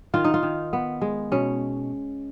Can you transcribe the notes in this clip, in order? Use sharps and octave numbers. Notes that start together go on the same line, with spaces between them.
D#3 F4
D#4
F4
D#3
B3
G#3
B2 C#4